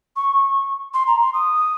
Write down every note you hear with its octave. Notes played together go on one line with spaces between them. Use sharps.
C#6
C6
A#5
C6
D#6